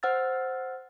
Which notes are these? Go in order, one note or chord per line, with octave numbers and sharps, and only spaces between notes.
C5 F#5 E6 F6 A6